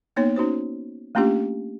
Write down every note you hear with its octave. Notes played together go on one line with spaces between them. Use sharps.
A#3 B3 D#4 C#5
C#4 D#4 F#4 C5
A3 A#3 C#4 D4 F4 G4